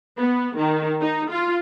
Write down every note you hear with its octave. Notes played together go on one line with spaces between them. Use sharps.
B3
D#3
D#4
F4